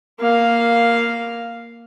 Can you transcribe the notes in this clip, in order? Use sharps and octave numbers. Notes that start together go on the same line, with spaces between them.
A#3 F5